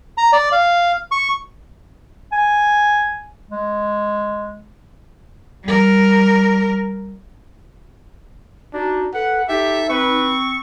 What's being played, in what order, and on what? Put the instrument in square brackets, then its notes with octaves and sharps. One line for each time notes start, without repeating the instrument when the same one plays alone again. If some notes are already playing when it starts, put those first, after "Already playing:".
[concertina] A#5
D5
F5
C#6
[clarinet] G#5
G#3
[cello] G3 A#4
[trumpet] D4 [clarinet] D#4 [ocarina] F#4
[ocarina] A4 [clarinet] B4 [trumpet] F#5
[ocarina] D#4 [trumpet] G4 [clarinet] A4 [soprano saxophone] E5
[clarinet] C4 [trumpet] B4 [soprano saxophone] C#6